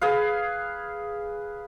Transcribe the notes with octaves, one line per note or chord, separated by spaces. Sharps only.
G#4 B4 F5